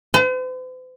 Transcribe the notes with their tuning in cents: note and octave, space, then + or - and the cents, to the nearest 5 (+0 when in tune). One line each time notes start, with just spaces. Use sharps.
C5 -45